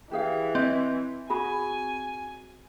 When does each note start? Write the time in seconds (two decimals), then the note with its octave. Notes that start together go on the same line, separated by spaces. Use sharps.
0.11 E3 G4 G#4 F5
0.55 C4 C#5 D#5
1.30 F#4 G#4 G#5 B5